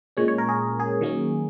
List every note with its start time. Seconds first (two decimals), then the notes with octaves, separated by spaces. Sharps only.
0.17 A#2 G#3 C#4 C#5
0.28 C#5
0.38 A#4
0.49 G#4
0.80 G#4
1.01 D#3 F#3 A#3 C#4